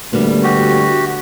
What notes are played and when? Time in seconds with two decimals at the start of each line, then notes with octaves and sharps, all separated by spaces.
0.13 D2 G3 A#3 B3
0.43 F#4 G4